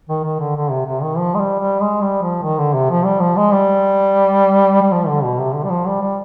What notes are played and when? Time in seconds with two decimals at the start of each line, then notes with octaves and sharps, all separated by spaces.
0.09 D#3
0.24 D#3
0.40 D3
0.56 D3
0.71 C3
0.86 C3
1.02 D#3
1.18 F3
1.34 G#3
1.39 G3
1.60 G3
1.80 G#3
2.01 G3
2.22 F3
2.43 D#3
2.58 D3
2.74 C3
2.90 F3
3.05 G3
3.20 F3
3.36 G#3
3.52 G3
4.82 G3
4.92 F3
5.07 D3
5.24 B2
5.39 C3
5.54 D3
5.64 G3
5.70 F3
5.86 G3
6.02 G3